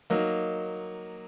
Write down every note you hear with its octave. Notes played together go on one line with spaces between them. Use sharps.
F#3 A#3 D#4